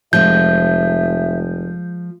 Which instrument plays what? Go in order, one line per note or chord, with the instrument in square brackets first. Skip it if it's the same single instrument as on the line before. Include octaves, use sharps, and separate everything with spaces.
[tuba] F1 [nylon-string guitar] F3 G#3 [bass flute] E5 [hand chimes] G6